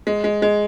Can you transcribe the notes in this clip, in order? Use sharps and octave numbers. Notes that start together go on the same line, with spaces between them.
G#3
G#3
G#3